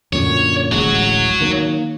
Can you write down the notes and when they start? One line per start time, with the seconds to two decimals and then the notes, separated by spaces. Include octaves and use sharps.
0.13 F#2 A#2 D3 C#5
0.72 D1 A1 G#3 F#4 C#5
1.41 D#3 A#3